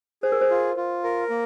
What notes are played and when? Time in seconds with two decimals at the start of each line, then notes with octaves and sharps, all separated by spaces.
0.23 G#4 C5
0.32 A#4
0.41 C5
0.51 F4
0.77 F4
1.04 A#4
1.30 A#3